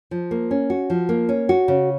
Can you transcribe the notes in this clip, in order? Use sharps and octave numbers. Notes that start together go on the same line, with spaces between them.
F3
A#3
C#4
F#4
F3
A#3
C#4
F#4
C#3